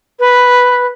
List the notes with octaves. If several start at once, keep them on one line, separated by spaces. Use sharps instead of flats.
B4